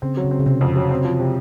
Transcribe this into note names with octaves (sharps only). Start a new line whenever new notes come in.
C#3 C4
F#3
C#3
C4
C#3
C3 C4
F2 C#3
F#3
C4
F3
C3